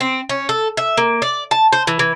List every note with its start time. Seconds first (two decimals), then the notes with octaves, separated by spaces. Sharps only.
0.01 C4
0.29 C#4
0.49 A4
0.77 E5
0.98 A#3
1.22 D5
1.51 A5
1.73 C5
1.87 E3
1.99 E3